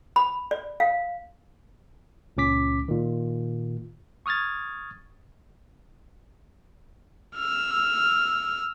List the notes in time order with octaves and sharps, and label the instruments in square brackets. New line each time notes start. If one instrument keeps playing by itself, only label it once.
[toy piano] B5
D5
F5
[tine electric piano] C#2 A#2 C#4 D6 B6
A#2 D#3
C#6 D#6 F6 G#6 A6
[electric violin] E6 F6